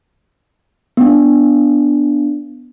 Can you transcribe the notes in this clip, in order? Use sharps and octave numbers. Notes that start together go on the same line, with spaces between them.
B3 D4